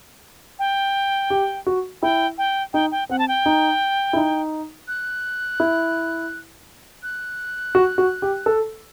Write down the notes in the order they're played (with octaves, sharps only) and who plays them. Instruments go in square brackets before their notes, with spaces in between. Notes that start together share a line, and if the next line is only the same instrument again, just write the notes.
[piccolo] G5
[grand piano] G4
F#4
[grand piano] E4 [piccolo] G5
[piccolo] G5
[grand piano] D#4 [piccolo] G5
[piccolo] G5
[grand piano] C4 [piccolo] F#5
[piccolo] A5
G5
[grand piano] D#4
E4
D#4
[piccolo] F#6
[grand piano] E4
[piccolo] F#6
[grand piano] F#4
F#4
G4
A4